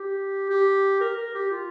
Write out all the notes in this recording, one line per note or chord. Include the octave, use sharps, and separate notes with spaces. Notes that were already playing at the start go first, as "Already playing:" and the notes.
Already playing: G4
G4
A#4
A#4
G4
F4